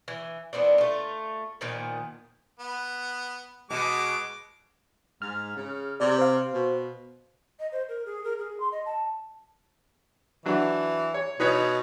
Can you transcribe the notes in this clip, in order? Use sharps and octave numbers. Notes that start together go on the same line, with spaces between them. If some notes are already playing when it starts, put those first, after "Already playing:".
E3
E3 B3 C4 D4
A3 F4
A#2 D#3 F3 B3
B3
B2 G#3 D6
G#2 F6
C#3
C3 D5
C5 F5
B2
D#5
C5
A#4
G#4
A#4
G#4
C6
D#5
A5
E3 F#3 D4
C#5
B2 D#4 B4 C#5